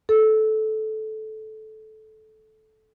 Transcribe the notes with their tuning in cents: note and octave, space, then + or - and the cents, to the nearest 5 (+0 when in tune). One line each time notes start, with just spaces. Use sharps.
A4 -15